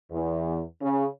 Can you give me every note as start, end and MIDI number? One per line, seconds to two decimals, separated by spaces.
0.12 0.61 40
0.82 1.04 49